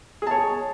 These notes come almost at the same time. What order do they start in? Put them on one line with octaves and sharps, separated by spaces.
G#4 A5 C#5